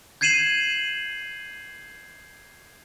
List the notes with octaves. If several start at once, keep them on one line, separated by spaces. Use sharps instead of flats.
G6 G#6 C7 D#7 E7 F#7